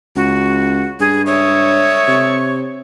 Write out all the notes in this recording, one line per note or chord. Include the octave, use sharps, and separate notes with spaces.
C#2 F#4
G2 G#4
C#5 E5 C#6 D#6
C3